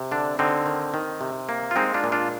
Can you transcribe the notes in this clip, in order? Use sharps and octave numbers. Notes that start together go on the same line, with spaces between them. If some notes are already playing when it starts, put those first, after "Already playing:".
Already playing: C3
D3 D4
D3 C4 D#4
D#3
D#3
C3
A#3
F4
G#3 C4 D#4
D4 F4
A#2
D4 F4